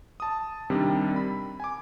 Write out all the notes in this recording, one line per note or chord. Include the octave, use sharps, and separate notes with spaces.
A5 D#6
C3 D#3 G3 C4 D4
B5
G#5 D6